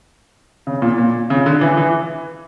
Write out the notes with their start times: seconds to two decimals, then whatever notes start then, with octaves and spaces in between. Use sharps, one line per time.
0.67 C#3
0.82 A#2
0.98 A#2
1.30 C#3
1.46 D3
1.61 E3
1.78 E3